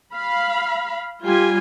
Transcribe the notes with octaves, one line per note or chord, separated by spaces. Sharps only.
F5 B5
G3 F4 G4 G#5